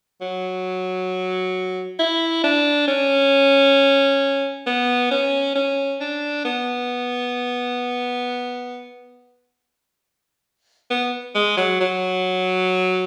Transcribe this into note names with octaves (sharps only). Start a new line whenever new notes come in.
F#3
E4
D4
C#4
B3
C#4
C#4
D4
B3
B3
G#3
F#3
F#3